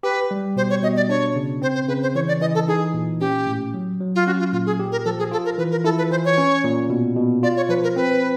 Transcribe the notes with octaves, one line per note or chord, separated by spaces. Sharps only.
G4 B4
G3
B2 C5
C#5
B2 D#5
D5
D4 C#5
C#3
C4 C5
C5
C#3 B4
C5
E3 C#5
D5
E3 D#5
A4
D#4 G#4
A#2
C#4 G4
A2
F#3
F#3
F4
C#4 F#4
F4
A#2 F4
G#4
G4
A#4
F3 A4
G#4
F4 A4
A#4
E3 B4
A#4
E4 A4
B4
E3 C5
C#5
C#4
A#2
B2
B2
F4 D5
C#5
F3 B4
A#4
C4 B4